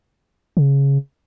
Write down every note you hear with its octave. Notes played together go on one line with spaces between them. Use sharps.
C#3